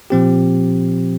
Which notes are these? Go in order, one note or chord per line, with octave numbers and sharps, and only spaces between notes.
A#2 F3 C4 G4